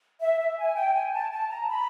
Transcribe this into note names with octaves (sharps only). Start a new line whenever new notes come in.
E5
E5
G#5
G5
G#5
A5
A5
A#5
B5